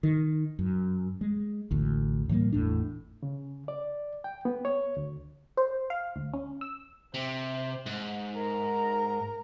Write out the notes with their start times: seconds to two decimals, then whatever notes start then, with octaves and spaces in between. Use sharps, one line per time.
0.03 D#3
0.59 F#2
1.21 G#3
1.71 A1 D2
2.29 A2 E3 G3 A#3
2.52 G#1 E2 A2 D4
3.23 C#3
3.68 D5
4.24 G5
4.45 B3
4.65 C#5
4.97 D2
5.57 C5
5.90 F5
6.16 D2
6.34 C#4
6.61 E6
7.14 C3 C5
7.86 G#2
8.35 A#4 A#5